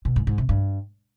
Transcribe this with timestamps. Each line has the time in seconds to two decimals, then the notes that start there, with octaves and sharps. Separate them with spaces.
0.05 B2
0.16 G#2
0.27 G#2
0.38 C3
0.49 G2